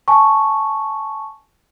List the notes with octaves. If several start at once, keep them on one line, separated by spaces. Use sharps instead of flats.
G#5 A5 C#6